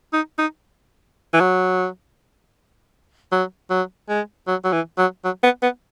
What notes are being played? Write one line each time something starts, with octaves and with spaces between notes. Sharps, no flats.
D#4
D#4
E3
F#3
F#3
F#3
G#3
F#3
F#3
E3
F#3
F#3
B3
B3